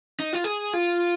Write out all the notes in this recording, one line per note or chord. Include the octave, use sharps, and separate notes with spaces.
D#4
F4
G#4
F4